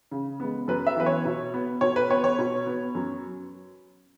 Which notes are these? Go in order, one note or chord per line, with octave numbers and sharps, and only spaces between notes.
C#3
G#3 B3
F#2 B4
E5
E3 B3 B4
C#5
B2
B3
B2 C#5
B4
B3 C#5
C#5
B2
B3
F#2